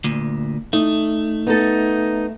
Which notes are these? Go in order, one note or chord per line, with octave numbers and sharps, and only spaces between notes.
D2 A#2
A3 D#4
B3 D#4 A4